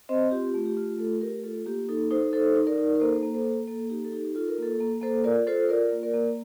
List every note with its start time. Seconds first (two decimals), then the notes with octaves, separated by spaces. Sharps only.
0.09 C4 C5 D#5
0.31 F4 G4
0.54 A3
0.66 G4
0.77 F4
0.98 A3 A4
1.21 A3 G4 A#4
1.44 F4 A4
1.66 A#3 G4
1.89 D#4 A4
2.11 D#4 A4 C5
2.33 D#4 A4 C5
2.56 D#4
2.67 A#4 D5
2.78 D#4
2.96 A#4
3.00 A#3 A4 C5
3.23 A#3
3.34 A4 C5
3.45 A#3
3.67 A#3 A4
3.90 D#4 G4
4.05 A4
4.12 D#4 G4
4.35 F4 A4
4.48 A#4
4.58 A#3 A4
4.80 A#3
5.02 A#3 A4 C5
5.24 F4 A#4 D5
5.47 F4 A4 C5
5.69 F4 A#4 D5
5.92 A#3
6.03 A#4 D5
6.14 A#3